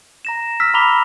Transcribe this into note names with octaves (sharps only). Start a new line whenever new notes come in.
A#5 A#6 E7
E6 F6 B6
A#5 B5 D6 F7 G7